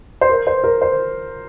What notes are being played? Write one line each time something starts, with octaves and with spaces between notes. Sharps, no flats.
C5
A#4
C5
A#4
C5